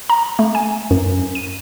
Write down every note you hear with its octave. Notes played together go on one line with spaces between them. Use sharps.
A#5
A3
G#5
F#2
D#7